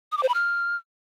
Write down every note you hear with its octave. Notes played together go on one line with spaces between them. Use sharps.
D#6
D6
C5
B5
F6